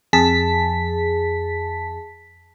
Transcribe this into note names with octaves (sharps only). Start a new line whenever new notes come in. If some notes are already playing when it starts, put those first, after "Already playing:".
F2 G#4 A5 B6